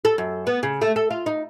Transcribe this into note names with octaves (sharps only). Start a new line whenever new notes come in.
A4
F#2
B3
C#3
A3
A4
F4
D#4